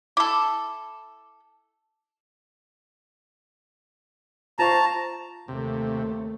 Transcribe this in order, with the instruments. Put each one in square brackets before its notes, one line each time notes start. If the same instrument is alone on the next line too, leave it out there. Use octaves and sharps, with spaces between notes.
[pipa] E4 A4 [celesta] D6
[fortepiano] F4 C5 C#6 [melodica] A5 A#5
[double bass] D#2 A3 [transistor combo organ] C3